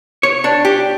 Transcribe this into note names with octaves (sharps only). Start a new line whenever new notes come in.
C#5
D4
G4